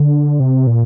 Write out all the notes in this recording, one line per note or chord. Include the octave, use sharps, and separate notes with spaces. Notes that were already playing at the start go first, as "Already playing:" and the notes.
Already playing: D3
C3
A#2